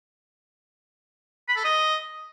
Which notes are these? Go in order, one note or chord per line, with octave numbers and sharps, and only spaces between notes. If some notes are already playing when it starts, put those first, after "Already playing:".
B5
A4
D#5